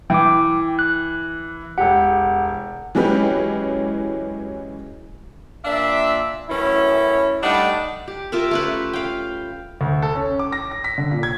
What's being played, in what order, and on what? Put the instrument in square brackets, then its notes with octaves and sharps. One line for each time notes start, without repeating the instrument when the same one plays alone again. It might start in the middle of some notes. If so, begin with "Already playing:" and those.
[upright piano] E3 [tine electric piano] G5 D6
[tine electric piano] F#6
[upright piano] E1 G4 [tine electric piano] F#5
[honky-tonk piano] E3 F#3 G#3 C#4 G4 B4
[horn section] A#2 D4 E5
F#2 A2 E3 C#4 E4
G3 A3 D4 D#4 F#5
[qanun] G4
F4 G4 A#4 E5
A3 C#4 B4
F5 G5
[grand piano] D2
A4
C#4
D6
A#6
A#6
B6
D3
A#2
G#6